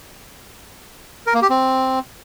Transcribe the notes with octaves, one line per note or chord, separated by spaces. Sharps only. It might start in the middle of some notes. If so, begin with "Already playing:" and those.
A#4
A#3
G4
C4